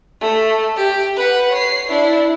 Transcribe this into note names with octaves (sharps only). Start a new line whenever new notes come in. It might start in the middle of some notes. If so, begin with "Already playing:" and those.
A3
G4
B4 F#5
C#5 C7
D4 E4